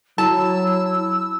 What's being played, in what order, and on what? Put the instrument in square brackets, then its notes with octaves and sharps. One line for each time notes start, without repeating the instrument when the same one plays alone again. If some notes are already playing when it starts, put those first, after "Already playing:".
[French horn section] F#3 [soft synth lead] E4 [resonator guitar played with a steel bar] A5 [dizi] E6